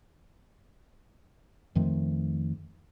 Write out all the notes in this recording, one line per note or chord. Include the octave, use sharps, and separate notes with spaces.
F2 D#3 F3 A3